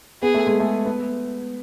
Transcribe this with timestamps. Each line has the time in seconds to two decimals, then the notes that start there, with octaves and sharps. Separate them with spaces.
0.22 B3 G#4
0.34 A3
0.47 G#3
0.60 A3
0.85 B3